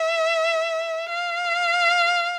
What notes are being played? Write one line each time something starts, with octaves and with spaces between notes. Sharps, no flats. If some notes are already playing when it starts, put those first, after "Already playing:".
Already playing: E5
F5